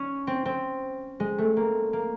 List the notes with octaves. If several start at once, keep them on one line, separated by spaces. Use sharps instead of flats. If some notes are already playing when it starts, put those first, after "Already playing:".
Already playing: C#4
C4
C4
G#3
A3
A#3
A#3